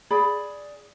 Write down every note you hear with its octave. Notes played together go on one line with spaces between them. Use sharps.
G#4 D5 B5